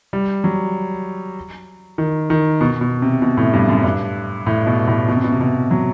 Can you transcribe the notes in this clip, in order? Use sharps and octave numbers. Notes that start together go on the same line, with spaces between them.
G3
F#3
D#3
D#3
B2
B2
C3
B2
A2
G2
F#2
G2
A2
B2
A2
B2
C3
B2
C3
B2
F#3